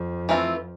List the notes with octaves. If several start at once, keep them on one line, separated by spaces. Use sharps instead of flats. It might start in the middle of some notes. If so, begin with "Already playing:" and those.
Already playing: F2
E3 A3 C4 F4